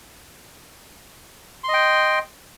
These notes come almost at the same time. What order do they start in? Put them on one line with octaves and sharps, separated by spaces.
C6 D#5 G5